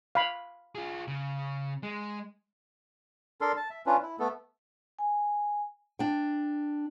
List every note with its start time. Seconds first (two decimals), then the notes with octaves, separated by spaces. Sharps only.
0.15 F5 B5
0.75 F4 G#4
1.08 C#3
1.83 G#3
3.41 D4 A4 A#4 C6
3.57 A5
3.70 E5
3.86 C#4 D4 F4 B4
4.02 E4
4.19 A3 B3 A4
4.99 G#5
5.99 D4 G5